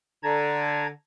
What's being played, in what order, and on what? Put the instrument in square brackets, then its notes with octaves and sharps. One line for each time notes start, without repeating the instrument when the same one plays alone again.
[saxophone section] D3 [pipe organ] A5 A#5 G#6